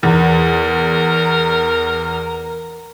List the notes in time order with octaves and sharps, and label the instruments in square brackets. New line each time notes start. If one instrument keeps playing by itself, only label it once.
[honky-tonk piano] E2 [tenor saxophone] A#4